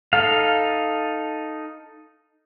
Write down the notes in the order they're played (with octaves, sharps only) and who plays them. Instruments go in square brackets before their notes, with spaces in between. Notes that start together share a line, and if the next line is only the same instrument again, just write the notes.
[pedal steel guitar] D#4 A4 F5